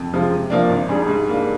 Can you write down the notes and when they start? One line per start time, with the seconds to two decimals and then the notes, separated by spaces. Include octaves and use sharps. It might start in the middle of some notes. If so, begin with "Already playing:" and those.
Already playing: F2
0.13 C3 F3 G#3
0.31 C3
0.50 F3 A#3 D4
0.69 G#1
0.89 G#2 G3 D4 G#4
1.08 G#2
1.27 G3 A#3 D4